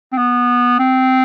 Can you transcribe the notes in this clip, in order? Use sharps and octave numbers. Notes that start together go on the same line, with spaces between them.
C4
B3
C4